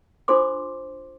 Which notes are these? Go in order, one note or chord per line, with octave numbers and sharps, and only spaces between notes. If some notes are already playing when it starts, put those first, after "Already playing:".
D4 F4 A4 C5 C6 D6